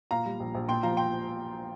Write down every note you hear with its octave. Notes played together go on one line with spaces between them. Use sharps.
A#2 F5 A#5
G3
A#1
A#1
A#2 G5 C6
F3 F5 A#5
G5 C6